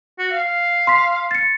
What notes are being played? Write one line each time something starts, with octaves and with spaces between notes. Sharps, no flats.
F#4
F5
C6 B6
A6 C#7